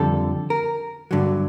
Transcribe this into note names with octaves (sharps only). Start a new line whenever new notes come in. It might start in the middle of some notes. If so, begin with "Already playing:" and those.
Already playing: F2 D3 G3 A4
A#4
G2 D3 F#3